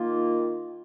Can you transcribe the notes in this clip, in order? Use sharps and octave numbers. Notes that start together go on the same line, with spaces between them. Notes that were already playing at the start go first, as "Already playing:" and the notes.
Already playing: D#3 A#3 F4